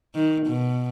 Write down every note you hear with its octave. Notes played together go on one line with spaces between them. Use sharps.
D#3
B2